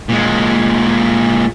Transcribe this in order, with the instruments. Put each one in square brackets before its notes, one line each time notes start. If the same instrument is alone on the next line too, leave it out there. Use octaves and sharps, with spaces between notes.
[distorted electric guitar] A#2 G#3